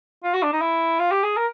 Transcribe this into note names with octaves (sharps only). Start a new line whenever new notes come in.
F4
F#4
D4
D#4
E4
F4
G4
G#4
A#4